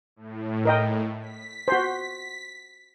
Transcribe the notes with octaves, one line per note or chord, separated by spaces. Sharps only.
A2
A#4 D#5 G5
B6
F#4 C5